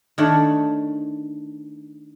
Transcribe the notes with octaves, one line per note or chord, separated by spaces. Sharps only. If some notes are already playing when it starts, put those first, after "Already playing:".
D#3 A3 D4 C#5 F#5